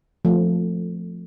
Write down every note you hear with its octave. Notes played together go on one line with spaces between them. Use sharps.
F3 A3